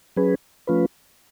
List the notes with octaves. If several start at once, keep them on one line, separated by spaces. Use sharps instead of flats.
F#3 C#4 G#4 B4
F3 A3 C#4 F4 B4